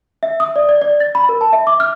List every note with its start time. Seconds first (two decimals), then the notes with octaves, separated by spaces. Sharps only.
0.23 E5
0.40 D#6
0.56 D5
0.69 D5
0.82 D5
1.00 A6
1.15 B5
1.29 A#4
1.41 A5
1.53 E5
1.67 D6
1.80 F6